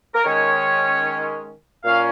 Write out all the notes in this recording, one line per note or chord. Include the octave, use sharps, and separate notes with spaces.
A#4
D#3 G#3 C#4 C#5
A#2 A#3 C#4 F5